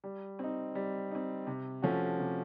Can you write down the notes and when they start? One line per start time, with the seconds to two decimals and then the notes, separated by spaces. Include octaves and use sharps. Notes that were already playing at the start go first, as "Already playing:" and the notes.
0.04 G3
0.39 C4 D#4
0.75 G3
1.11 C4 D#4
1.47 C3
1.82 F3 A3 C#4 F#4
2.19 C3